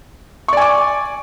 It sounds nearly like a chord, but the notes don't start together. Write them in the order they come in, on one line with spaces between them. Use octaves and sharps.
C#6 D5 G#5 D6